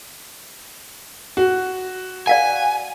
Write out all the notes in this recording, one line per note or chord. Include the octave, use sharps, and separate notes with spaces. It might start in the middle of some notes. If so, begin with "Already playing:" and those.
F#4
D5 F5 F#5 G#5